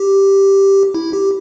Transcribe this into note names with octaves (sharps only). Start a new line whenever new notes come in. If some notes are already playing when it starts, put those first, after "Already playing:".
Already playing: G4
E4
G4